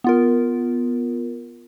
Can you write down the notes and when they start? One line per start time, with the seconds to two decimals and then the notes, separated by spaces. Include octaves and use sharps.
0.04 B3 F4 A#4